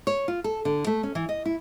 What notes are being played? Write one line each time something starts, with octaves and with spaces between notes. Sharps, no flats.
C#5
F4
A4
D3
A3
C#4
E3
D#5
E4